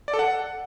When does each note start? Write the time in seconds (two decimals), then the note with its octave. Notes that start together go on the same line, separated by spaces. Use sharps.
0.08 D5
0.13 A4
0.19 F#5